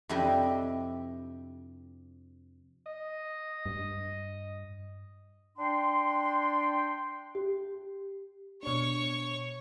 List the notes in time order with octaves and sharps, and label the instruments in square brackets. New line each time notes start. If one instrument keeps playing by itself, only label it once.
[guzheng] F2 C3 D4 E4 G4 D#5
[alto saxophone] D#5
[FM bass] G2
[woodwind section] D4 G5 C6
[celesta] G4
[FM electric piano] B2 D4 [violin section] C#5 C#6